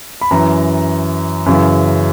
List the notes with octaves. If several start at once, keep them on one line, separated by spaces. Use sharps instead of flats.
B5
F#2 E3 A#5
F#2 C#3 E3